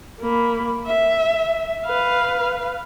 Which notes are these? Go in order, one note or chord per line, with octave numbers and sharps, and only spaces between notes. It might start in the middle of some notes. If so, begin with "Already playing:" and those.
A#3 B5
E5
B4 F5